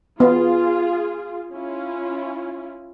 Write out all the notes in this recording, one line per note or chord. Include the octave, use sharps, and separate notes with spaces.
B3 F4 G#4
C#4 E4 F4